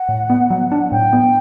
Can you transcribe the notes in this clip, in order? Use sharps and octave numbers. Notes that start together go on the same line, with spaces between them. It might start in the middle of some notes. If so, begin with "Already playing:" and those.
Already playing: F#5
A2
B3
F#3
D4
A2 G5
B3